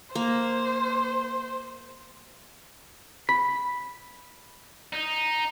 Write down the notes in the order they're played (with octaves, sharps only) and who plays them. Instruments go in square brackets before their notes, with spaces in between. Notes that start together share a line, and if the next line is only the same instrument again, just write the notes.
[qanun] A#3 [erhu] C5
[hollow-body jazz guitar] B5
[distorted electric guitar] D#4